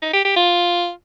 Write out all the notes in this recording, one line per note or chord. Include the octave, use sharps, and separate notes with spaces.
D#4
G4
G4
F4